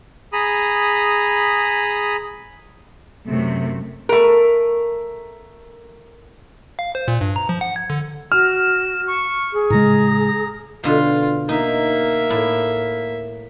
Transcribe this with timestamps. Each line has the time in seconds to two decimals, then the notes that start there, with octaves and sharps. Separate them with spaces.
0.33 G#4 A#5 B5 D#6
3.27 F#2 C3 A3
4.09 A3 A#4
6.79 F5
6.95 C5
7.08 A#2
7.21 G2
7.36 A#5
7.49 F3
7.61 F#5
7.76 G#6
7.90 D3
8.32 F#4 F6 E7
9.07 C#6
9.53 G#4
9.70 A2 C#3 G#3 A#5
10.84 B2 D3 F4
11.49 A#3 D#4 E5
12.30 A2